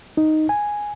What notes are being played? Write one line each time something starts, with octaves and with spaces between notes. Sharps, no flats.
D#4
G#5